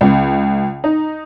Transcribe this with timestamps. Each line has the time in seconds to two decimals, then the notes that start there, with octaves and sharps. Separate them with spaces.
0.01 C#2
0.84 D#4